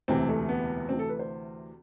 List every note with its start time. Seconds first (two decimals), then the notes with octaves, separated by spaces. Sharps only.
0.08 E1 D2 C3 E3 C4
0.29 A3
0.49 B3
0.89 D2 C3 E3 C4
0.99 A4
1.09 B4
1.19 C5